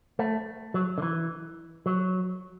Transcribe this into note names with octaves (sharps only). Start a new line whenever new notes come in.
A3
F#3
D3
E3
F#3